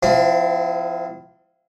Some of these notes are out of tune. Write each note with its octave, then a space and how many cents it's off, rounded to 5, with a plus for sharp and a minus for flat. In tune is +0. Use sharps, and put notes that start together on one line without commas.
F3 +0 C4 -40 E4 +0